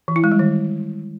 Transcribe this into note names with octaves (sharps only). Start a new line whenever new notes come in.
E3
E4
G#3
G3
D#3